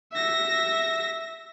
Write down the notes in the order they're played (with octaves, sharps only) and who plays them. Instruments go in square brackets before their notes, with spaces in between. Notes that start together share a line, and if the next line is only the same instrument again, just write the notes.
[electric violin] E5 A#6